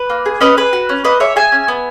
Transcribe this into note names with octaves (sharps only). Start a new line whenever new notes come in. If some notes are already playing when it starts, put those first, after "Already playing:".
Already playing: B4
A#3
G#4
C#4 B4 D#5
G#4 B4
F#4
C#4
A#3 B4 D#5
G#4 C#5 E5
G#4 E5 G#5
C#4
B3